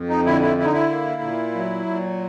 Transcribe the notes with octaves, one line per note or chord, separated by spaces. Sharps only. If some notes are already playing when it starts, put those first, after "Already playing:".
Already playing: F2
D#4
D3 E4
E4
D3 E4
D#4
E4
A#3
A#2
F#3
A#2